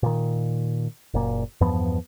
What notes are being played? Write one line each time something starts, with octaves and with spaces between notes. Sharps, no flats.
A#2 D#3
F#1 A#2
E2 G2 F3 B3